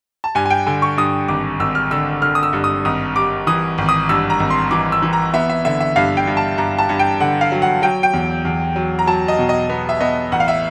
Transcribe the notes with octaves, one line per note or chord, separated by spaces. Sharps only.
A5
G2 G#5
G#5
G5
D3 G#5
C#6
G2 D#6
G#1 D6
G#1 E6
F6
D3 E6
D3 F6
D#6
E6
G2
D#6
G#1 D#6
G3 D6
E3 D#6
G#1
D#6
G2 E6
A#5
G#1
C6
E3 D6
E6
E3
A#5
B3 E5
E5
D3 E5
E5
G2 F5
G5
G2
A5
G2 A#5
A5
G2
G5
D3 F#5
F5
F#3
F#5
F#3 G5
G5
E2
E2
F#3
A#5
F#3 A5
D#5
B2
D#5
B3
E5
B3 D#5
A1 F#5
F5
E5